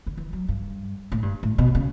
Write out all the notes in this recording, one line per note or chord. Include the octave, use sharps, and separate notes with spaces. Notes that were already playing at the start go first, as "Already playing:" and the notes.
D3
E3
F#3
G2
A2
G2
A2
B2
C#3